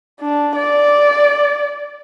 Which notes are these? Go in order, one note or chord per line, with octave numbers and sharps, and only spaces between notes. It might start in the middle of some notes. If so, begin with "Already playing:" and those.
D4
D5